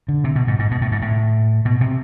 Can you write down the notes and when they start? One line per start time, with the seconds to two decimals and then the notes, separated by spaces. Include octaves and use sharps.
0.08 D3
0.24 C3
0.36 B2
0.47 G#2
0.59 G#2
0.71 B2
0.81 A2
0.92 G#2
1.02 A2
1.65 B2
1.81 C3